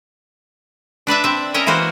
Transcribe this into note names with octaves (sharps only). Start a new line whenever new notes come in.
D4 B4 D5 E5
C4 E5
C#4 A#4 D#5 E5 G5
E3 A#3 F#4 C5